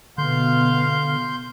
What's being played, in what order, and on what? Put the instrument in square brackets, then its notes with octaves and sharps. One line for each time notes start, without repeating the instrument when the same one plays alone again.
[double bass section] B2 B3 [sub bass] D3 [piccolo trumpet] F5 [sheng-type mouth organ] C6 G6